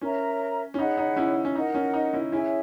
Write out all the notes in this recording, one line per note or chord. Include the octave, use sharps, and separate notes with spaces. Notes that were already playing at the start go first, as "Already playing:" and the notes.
C#4 A#4 C#5 E5 A#5
C#4
D#4 G#4 C#5 F#5 B5
D#4
C#4 E4
C#4
D#4 A#4 D#5 F#5
C#4
D#4
C#4 E4
C#4 E4 G#4 C#5 E5 G#5